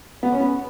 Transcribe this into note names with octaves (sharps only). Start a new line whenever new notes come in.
B3
C#4
B3